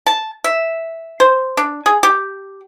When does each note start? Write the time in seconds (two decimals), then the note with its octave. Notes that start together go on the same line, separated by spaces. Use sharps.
0.06 A5
0.44 E5
1.20 C5
1.57 D4
1.86 G#4
2.03 G4